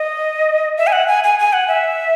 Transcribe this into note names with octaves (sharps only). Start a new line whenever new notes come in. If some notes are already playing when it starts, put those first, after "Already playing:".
Already playing: D#5
E5
G#5
F#5
G#5
G#5
G#5
F#5
E5